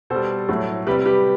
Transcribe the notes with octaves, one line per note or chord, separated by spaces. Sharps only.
B2 G3 A4 C5
A2 F#3 A3
C3 G3 G4 B4
G4 B4